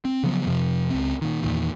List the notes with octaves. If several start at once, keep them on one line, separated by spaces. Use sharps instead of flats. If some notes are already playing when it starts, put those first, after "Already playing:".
C4
C#3 F3 F#3 B3
F2 C3 F3
C#2 C4
A#2 D#3
E2 A#2 D#3